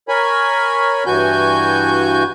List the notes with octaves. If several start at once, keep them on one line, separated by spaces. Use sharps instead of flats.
A#4 C#5 G#5 B5
G2 E3 F#4 G#5 G6